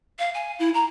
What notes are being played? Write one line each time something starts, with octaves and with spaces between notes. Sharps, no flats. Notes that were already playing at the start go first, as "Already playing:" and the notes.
F5
G#5
E4
A#5